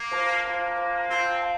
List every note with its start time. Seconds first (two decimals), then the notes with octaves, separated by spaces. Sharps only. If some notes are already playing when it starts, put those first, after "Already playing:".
Already playing: A#3
0.11 F4 C5 F5 A5
0.44 A#3 F4 C5 F5 A5
0.76 F4 C5 F5 A5
1.09 C4 F4 C5 F5 A5
1.42 F5 A5